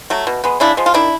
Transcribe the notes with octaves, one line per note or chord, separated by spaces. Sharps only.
F#3 A3
B2
G#3 B3
C#3 D4 E4
F3 G#3
F4
D#3 D4 E4